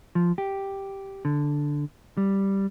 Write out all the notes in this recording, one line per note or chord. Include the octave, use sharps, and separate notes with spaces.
F3
G4
D3
G3